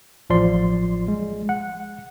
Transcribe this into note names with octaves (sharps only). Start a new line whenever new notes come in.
A1 F3 D5 C6
G#3
F#5